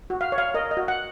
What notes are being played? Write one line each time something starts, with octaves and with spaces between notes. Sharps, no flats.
F#4
F5
C#5
F5
A#4 D#5
D#5
F#4
F#5